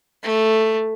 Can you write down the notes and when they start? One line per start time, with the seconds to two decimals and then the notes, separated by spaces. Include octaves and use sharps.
0.23 A3